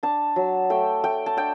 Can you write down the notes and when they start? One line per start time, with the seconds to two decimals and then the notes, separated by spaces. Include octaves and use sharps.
0.03 D4 A5
0.36 F#3
0.70 A3 G5
1.04 A3 G5
1.26 A5
1.37 D4 G5